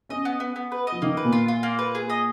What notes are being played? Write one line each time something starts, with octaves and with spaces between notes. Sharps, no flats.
C#4 D#5
B3
B3
B3
B4
D#5
F3
D#3 A#3
B4
A#2
F4
F4
A#3
B4
G#4
D#5